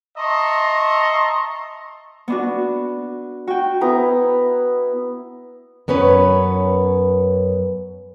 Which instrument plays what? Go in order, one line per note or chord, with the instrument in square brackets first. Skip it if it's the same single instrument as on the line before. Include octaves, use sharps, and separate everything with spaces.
[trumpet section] D#5 E5 A5 A#5 C6 C#6
[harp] B3 D4 F#4
F#4 G5
[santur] B3 E4 A#5
[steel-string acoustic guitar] F#2 B3 C#4 B4 C#5